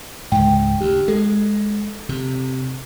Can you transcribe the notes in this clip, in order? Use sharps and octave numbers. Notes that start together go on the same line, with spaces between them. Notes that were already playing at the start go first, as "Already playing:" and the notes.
C#2 G#2 G5
D2 G4
G#3 A4
C3